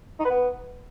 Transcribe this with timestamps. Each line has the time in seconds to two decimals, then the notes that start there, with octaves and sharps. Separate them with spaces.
0.19 D#4
0.25 B4
0.30 B3